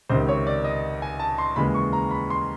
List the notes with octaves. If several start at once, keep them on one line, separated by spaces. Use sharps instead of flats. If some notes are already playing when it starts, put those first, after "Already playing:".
C#2 C3 D#3 C5
C#5
D5
D#5
G#5
A5
C6
D#2 C#3 E3 G#3 B5
C#6
A#5
B5
C6